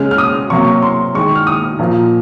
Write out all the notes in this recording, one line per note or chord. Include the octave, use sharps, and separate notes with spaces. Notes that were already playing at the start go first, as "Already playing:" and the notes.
Already playing: C#3 G#3 F6
F6
D#6
C3 F#3 A#3 C#6
C6
D#3 G#3 C#6
F6
D#6
A#2 F3 A#3